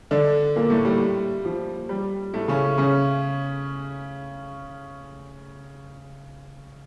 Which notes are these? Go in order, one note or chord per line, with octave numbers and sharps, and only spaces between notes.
D3 D4
A#2 A#3
A2 A3
G3
F3
G3
A2 A3
C#3 C#4
C#3 C#4